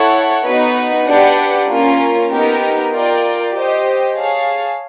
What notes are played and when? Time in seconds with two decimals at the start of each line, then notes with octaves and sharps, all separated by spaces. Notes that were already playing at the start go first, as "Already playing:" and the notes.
Already playing: E4 A4 C#5 F#5
0.46 B3 D#4 F#4 B4
1.07 D4 G4 B4 D5 F#5
1.69 A#3 C#4 F4 A#4
2.31 B3 D#4 G4 A#4
2.92 F4 A#4 D5 G5
3.53 G4 C5 D#5
4.15 G#4 C#5 F5 A5